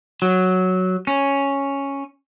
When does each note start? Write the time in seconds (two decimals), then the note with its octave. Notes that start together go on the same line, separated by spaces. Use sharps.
0.22 F#3
1.07 C#4